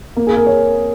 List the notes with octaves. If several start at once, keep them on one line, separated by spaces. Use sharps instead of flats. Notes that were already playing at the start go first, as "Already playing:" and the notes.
A#3
G#4
A#4
C#5